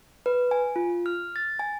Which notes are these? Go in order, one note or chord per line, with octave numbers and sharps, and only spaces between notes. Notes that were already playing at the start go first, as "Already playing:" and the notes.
B4
G#5
F4
F6
A6
G#5